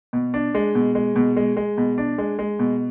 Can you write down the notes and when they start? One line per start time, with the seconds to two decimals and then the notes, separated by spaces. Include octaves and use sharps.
0.13 B2
0.34 D4
0.55 G#3
0.75 B2
0.95 G#3
1.16 B2
1.37 G#3
1.57 G#3
1.77 B2
1.98 D4
2.18 G#3
2.39 G#3
2.59 B2